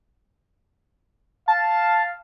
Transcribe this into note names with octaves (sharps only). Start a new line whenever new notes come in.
F5 A5